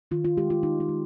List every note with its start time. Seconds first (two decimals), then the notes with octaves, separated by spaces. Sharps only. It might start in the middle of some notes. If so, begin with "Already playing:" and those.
0.11 D#3 F4
0.25 F4
0.37 G#3 G4
0.50 F4
0.63 D#3 D#4
0.80 D#4
0.89 G#3